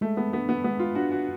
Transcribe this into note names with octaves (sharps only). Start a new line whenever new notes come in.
G#3 A3
B3
B3 D4
B3
G#3 B3
F4
D4 F#4
F#4